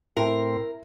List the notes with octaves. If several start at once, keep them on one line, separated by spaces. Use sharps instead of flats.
A2 C4 E4 A#4 G5